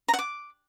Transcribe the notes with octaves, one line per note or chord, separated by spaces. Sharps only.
A#5
F#5
D6